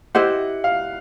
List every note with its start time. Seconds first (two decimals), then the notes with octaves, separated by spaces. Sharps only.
0.15 E4 G4 C5 D#5 F#5
0.64 F5